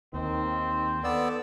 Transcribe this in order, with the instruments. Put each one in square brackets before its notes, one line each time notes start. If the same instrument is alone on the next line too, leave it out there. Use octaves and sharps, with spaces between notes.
[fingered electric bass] D#2 [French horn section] D#3 [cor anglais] C4
[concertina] B3 D5 E6 [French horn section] A4 B4